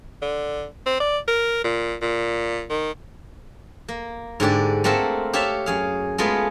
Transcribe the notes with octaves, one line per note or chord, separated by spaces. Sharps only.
D3
C4
D5
A#4
A#2
A#2
D#3
A#3
G#2 D3 G4 D5
A3 A#3 C4 A#4 F#5 A5
G4 C#5 E5 F5 A5
F#2 G#4 F5
G#3 A3 B3 F4 G#4